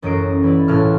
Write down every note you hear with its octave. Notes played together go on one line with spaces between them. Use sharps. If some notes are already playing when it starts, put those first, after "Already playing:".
A1 F#2 F#3 D#5 C7 D7
E3 E4 D5
C#2 A2 A5 F6 F#6